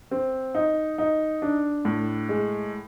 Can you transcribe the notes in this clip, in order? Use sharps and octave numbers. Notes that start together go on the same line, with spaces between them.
C4
D#4
D#4
D4
A2
G#3